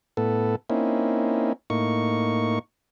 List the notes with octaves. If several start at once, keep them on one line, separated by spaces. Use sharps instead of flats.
A2 B3 A4
A#3 C4 C#4 D#4 E4
A2 A#3 D#4 C#6